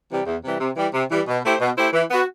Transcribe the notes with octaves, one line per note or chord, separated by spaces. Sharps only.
C3 E3 G3
E2
C3 E3 G3
C3
E3 G3
C3
E3 G3
B2
A3 E4 G4 C5
B2
A3 E4 G4 C5
E3
B3 F#4